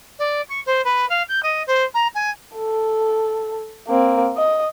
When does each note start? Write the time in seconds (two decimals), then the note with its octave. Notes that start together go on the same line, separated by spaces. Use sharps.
0.19 D5
0.49 C#6
0.66 C5
0.84 B4
1.09 F5
1.28 G6
1.43 D#5
1.67 C5
1.94 A#5
2.14 G#5
2.56 A4
3.88 A#3 C4
4.37 D#5